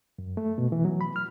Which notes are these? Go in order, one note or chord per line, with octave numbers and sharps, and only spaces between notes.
F#2
A3
B2
E3
F#3
B5
F6